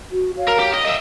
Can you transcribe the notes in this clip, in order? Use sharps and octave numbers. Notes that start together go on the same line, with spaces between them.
F#4
C#5 F5
A#4
G4
D#5
D#5 E5